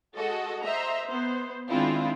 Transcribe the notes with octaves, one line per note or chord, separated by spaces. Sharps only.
G#3 F#4 A4 D#5
C5 D#5 E5 A#5
B3 C5
D#3 G#3 C4 D4 E4 F4